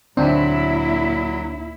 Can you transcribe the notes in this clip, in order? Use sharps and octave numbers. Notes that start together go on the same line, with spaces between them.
D2 A#2 F#3 C4 D4 E4